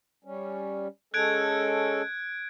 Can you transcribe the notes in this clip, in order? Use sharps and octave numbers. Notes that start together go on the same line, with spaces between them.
G3 C#4
G#3 C#4 A4 F#6 G#6 D7